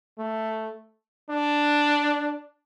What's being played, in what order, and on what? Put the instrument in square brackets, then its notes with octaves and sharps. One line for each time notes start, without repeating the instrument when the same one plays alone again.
[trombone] A3
D4